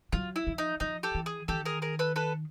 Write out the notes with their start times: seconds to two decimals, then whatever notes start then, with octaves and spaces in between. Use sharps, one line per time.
0.12 F#3 F4
0.36 E4
0.47 F3
0.58 D#4
0.80 F3 D#4
1.03 G4 A4
1.15 E3
1.26 G#4
1.48 D#3 G4 A4
1.65 G#4 A#4
1.82 G#4 A#4
1.99 A4 B4
2.16 A4 B4